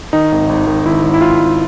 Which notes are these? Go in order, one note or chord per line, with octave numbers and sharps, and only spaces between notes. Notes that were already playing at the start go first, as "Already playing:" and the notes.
D#3 D#4
G#1
G#1
D#3
G#1 E4
G#1
E4
G#1 F4
G#1